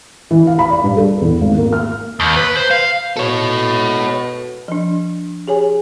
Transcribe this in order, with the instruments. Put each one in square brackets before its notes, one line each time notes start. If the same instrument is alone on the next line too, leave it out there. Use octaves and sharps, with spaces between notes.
[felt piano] E3
F5
B5
D5
G2
A4
E2
G#1
A#3
F6
[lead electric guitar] D#2
B4
C5
F5
[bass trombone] B2 [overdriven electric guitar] A4 C#5
[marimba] F3 D4
G4 G#4 C#5 G#5